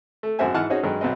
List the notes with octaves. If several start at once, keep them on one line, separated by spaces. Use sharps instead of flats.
A3
G#1 F#2 F#4 C5 E5 G#5
G#2 E3 F#5 G#5 A5 F6
C#4 D#4 F#4 G#4 C5
G2 F#3 G#3
B1 B3 C4 D#5